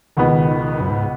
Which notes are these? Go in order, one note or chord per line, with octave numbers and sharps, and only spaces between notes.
C#2 B2 D#3 B3
F#2
G#2